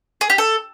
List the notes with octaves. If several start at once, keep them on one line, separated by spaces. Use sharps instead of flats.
G#4
G4
A4